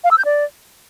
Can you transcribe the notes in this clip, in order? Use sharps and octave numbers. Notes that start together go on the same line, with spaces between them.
F5
E6
G6
D5